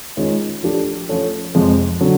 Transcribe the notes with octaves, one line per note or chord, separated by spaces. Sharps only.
D#3 G#3 C#4 F4
F3 A3 D4 G4
F3 A3 C#4
F2 C3 F3 G#3
D3 F#3